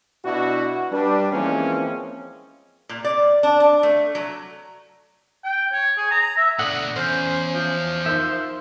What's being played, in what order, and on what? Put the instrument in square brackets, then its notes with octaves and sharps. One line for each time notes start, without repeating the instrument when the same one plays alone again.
[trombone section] B2 D4 E4 F#4
G3 D4 B4
E3 F3 G#3 A#3 C4 C#4
[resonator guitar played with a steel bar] A#2
D5
D4
D4
A3
F#3
[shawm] G5
C#5
G#4
A#5
E5
[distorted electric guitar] B2 A3 [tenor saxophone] D3 [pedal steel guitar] F#5 [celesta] D#6
[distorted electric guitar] E2 [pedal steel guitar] C#4 [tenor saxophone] C5 [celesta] F6 G6
[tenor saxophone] F3 [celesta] G6
[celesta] D#4 A#4 G6 [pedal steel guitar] E5 C6